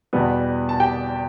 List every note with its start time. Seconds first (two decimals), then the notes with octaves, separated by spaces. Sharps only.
0.13 E2 B2 G3 B3
0.69 A5
0.80 G4 G5